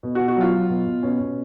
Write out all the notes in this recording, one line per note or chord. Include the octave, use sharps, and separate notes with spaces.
B2
F#4
B2
F#4
F#3 F4
F#3
B2
B2
B2 C#4
B2